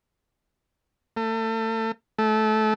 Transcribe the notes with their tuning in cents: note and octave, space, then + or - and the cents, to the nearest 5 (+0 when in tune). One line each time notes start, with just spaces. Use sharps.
A3 +35
A3 -20